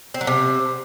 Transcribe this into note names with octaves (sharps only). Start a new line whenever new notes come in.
C4
F#3
C3